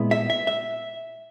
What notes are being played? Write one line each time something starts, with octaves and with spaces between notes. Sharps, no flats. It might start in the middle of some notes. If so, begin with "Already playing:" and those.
Already playing: A#2 G#3 B3 E4
E5
E5
E5